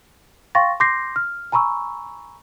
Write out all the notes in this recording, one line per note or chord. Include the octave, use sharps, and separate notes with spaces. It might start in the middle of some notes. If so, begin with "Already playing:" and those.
F5 G5 C6 C#6 A6 A#6
C6 D6 G6 A#6 C7
F6
G#5 A#5 B5 C#6 E6